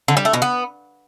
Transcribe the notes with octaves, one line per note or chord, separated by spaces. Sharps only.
D3
G3
A3
B2
B3